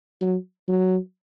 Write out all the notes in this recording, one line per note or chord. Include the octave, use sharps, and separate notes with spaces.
F#3
F#3